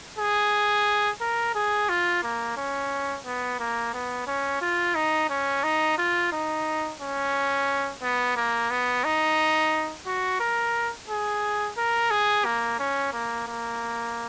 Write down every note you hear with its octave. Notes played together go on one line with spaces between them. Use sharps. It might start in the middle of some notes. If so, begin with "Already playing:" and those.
G#4
A#4
G#4
F4
A#3
C#4
B3
A#3
B3
C#4
F4
D#4
C#4
D#4
F4
D#4
C#4
B3
A#3
B3
D#4
F#4
A#4
G#4
A#4
G#4
A#3
C#4
A#3
A#3